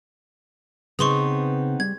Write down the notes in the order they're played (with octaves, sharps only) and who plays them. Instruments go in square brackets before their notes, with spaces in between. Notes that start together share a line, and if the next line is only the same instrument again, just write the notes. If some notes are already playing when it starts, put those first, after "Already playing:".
[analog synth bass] C#3 [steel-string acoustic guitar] B3 C4 D#4 [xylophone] G#4 C6 C#6
[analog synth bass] G3 [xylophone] G#6